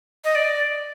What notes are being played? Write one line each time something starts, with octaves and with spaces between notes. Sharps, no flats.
D#5
D5